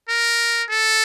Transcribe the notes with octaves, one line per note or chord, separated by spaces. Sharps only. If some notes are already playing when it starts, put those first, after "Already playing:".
A#4
A4